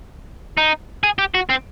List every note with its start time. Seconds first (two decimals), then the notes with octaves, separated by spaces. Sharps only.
0.58 D#4
1.03 G#4
1.19 G4
1.35 F#4
1.50 C4